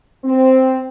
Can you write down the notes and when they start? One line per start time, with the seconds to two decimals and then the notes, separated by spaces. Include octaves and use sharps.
0.25 C4